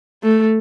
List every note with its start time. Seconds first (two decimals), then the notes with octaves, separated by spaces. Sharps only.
0.23 A3